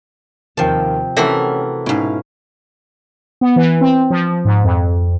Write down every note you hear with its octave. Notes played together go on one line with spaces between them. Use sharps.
D#2 C3 D#3 F3 G5 A5
C3 E3 A3 C#4 F#4 A4 A#4
G#2 B2 C#4 E4 F5
B3
E3
C4
F3
G#2
F2